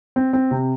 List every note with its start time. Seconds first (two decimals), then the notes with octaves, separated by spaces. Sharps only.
0.16 C4
0.33 C4
0.51 C3